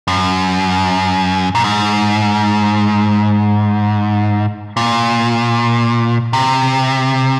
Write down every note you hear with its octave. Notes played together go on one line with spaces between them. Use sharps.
F#2
A#2
G#2
A#2
C3